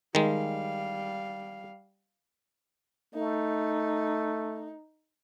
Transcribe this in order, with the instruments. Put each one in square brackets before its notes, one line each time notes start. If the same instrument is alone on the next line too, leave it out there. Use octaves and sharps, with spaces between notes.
[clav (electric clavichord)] D#3 G#3 [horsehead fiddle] G3 F5
[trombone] A3 [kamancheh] D#4